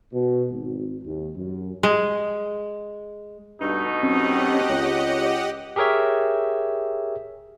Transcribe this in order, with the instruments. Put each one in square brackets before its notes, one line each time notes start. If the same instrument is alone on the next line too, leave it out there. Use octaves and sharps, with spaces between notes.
[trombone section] B2
G#1
D#2
F#2
[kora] G#3
[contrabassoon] G2 [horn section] B2 A3 D#4
[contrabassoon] F#2 [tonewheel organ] C4 C#4 [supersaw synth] G4 D#5 F#5
[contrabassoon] C#2 [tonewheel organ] C#5
[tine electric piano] G4 G#4 A#4 C#5 E5